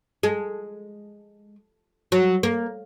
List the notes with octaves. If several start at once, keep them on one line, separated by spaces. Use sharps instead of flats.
G#3
F#3
A#3